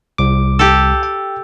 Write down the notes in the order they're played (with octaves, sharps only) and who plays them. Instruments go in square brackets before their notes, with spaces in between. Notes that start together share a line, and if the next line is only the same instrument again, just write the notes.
[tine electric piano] C2 D6
[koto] G4 A4
[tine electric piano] G5